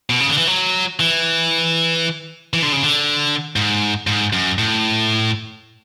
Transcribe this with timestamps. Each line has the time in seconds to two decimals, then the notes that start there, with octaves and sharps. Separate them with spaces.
0.10 B2
0.20 C#3
0.29 D3
0.38 E3
0.47 F#3
1.00 E3
2.53 E3
2.62 D3
2.72 C#3
2.82 D3
3.56 G#2
4.07 G#2
4.33 F#2
4.58 A2